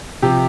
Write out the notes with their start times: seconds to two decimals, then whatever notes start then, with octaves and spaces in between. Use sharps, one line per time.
0.22 C3 F3 G4